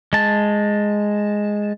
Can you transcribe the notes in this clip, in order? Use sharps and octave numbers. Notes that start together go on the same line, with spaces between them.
G#3 A5